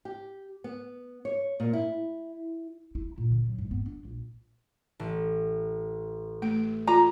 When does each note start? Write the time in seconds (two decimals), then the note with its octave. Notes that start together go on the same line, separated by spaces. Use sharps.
0.05 G4
0.64 B3
1.25 C#5
1.60 A#2
1.73 E4
2.95 E4
3.18 A#2
3.31 D3
3.46 F#3
3.58 G#2
3.71 B3
3.86 D4
4.05 A#1
5.00 A1
6.42 A3 D7
6.88 F4 A#5